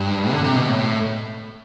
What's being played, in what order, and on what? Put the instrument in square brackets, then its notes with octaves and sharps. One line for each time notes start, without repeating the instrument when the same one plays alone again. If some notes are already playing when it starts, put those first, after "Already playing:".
Already playing: [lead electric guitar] G2
D3
C3
B2
A2